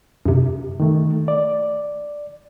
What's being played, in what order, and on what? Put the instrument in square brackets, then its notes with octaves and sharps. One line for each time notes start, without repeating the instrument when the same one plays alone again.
[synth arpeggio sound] F#2 C3
[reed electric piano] D#3 A3
D5